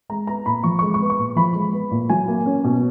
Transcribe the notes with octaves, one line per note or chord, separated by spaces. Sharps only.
G#3 A#5
B3 A#5
A#2 B5
F3 C#6
C#6
G#3
C#6
B3
C#6
A#2
F3 B5
G#3
B3
A#2
F#3 G#5
A#3
C#4
B2